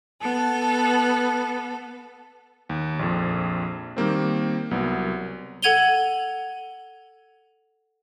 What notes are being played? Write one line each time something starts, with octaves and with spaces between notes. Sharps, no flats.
B3 A4
D#2
A#1 F2
D#3 G3 A#3 C4
C2 F#3 B3
A4 F#5 G#6 D#7 F7 G7